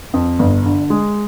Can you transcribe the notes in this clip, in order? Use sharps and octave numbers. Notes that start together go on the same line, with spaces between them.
F2
G1
D3
G#3